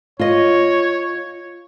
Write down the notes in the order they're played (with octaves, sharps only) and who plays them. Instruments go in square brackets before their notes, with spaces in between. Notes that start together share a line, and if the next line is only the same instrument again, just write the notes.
[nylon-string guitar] F4 D#5 [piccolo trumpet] C#5